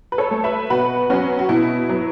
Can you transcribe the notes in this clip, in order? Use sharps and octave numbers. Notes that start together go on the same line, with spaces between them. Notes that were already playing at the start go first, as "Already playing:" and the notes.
B4
A4 C#5
A3
B4 E5
B2 F#4 B4
F#3 B3 C#4 F#4
F#4
B2 E4
F#3 B3